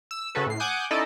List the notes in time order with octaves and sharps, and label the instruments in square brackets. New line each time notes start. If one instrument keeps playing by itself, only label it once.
[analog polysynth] E6
C#3 C#4 F#4 A4 B4
A2 C7
F#5 G#5 D6 D#6 F#6 G6
C#4 D#4 E4 A4 D5 D#5